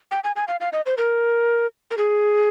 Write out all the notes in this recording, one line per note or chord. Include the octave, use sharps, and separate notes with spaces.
G5
G#5
G#5
F5
F5
D#5
C5
A#4
A#4
G#4